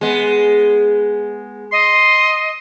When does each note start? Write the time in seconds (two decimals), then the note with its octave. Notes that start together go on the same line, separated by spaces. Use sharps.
0.01 G#3 B3
1.72 D#5 C6